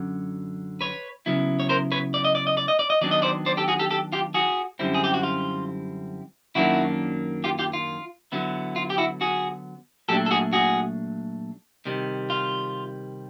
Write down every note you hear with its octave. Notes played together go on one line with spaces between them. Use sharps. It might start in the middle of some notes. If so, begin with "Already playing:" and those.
Already playing: F#2 D3 F#3
B4 C#5
C#3 F#3 B3 E4
C#5
A#4 C5
B4 C#5
D5
D#5
D5
D#5
D5
D#5
D5
D#5
D#3 F#3 B3 D4 D5
D#5
C5 D5
C5 D5
G4 A4
F#4 G#4
G4 A4
G4 A4
F4 G4
F#4 G#4
F#2 D3 G3 C4 E4
G#4
G4
F#4
F4
F#2 D#3 F#3 A#3 D4 E4 F#4
F4 G4
F4 G4
F4
D3 F#3 B3 E4
F4
G4
E4 F#4
F#4 G#4
A#2 F#3 A3 D4 G4 A4
A4
F#4 G#4
F#4 G#4
C3 D#3 G3
F4